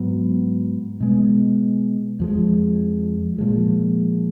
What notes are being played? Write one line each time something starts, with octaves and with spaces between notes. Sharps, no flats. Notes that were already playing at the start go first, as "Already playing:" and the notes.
Already playing: G#2 F#3 B3
B2 G#3 B3
F2 F3 G#3
A#2 F3 G#3